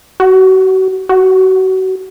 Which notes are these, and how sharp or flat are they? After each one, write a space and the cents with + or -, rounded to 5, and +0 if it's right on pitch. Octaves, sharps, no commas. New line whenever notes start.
F#4 +35
F#4 +30